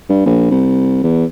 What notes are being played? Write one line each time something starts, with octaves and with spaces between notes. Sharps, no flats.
G2
A#1
C2
E2